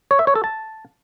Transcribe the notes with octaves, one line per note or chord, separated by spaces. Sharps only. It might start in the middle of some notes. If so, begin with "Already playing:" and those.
C#5
E5
C#5
A4
A5